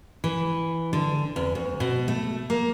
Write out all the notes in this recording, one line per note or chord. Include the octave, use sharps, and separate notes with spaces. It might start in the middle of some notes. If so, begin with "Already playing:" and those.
E3
D3
E2
D2
B2
A3
A#3